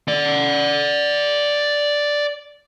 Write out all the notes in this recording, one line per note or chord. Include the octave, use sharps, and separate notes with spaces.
D5 F#5